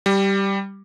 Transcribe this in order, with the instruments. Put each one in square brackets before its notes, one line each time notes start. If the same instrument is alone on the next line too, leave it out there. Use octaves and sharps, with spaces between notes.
[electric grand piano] G3